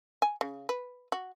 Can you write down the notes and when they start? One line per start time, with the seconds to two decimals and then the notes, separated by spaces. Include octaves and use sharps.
0.22 G#5
0.41 C#3
0.69 B4
1.12 F#4